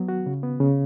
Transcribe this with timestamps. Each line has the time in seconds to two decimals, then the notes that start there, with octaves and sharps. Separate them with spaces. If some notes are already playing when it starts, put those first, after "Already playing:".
Already playing: F#3 B3
0.08 F#4
0.26 C#3
0.43 B3
0.60 C#3